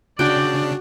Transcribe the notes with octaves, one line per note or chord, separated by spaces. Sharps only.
C#3 D4 F#4 D5 G5